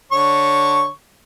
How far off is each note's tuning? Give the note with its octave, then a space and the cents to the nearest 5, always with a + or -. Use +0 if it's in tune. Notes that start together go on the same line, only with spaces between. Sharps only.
D3 +0 C#5 +0 C#6 +0